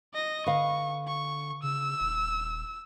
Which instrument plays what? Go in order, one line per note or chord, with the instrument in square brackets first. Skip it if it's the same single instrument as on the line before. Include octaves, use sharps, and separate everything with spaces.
[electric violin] D#5 A#6
[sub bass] D3 [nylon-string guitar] B4 F5 [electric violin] C#6
[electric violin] C#6
[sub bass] C#3 [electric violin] E6
[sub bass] D#1